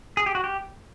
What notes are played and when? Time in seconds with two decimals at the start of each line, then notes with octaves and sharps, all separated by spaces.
0.17 G#4
0.26 G4
0.35 F#4
0.44 G4